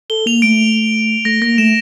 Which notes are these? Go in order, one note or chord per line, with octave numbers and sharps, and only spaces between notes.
A4 G7
A#3 F7
A3 D7
A3 A#6
A#3 A#6
A3 E7